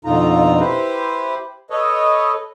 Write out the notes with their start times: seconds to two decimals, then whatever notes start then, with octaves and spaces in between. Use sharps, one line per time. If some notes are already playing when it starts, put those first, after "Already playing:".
0.05 F2 B2 D3 D#4 F4 A#5
0.60 E4 G4 B4 C5
1.70 A4 B4 C#5 D#5